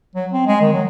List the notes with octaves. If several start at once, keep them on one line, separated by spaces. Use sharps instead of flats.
F#3
C4
G#3
D#3
F#3